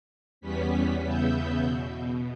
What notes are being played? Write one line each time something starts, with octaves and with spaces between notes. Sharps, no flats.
E2 G3 B3 C#4 B6
E2 C#3 B3 E5 G6
B2